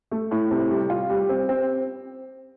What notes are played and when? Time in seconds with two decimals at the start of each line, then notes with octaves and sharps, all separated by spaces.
0.11 A3
0.31 A2
0.51 C3
0.71 G3
0.90 F4
1.10 G3
1.29 C4
1.49 C4